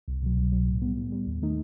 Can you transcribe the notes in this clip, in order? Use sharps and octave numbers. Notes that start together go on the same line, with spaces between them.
C2
B2 F#3
C2
B2 F#3
A2
G3 B3
A2
G3 B3
D#2
D#3 A3 D#4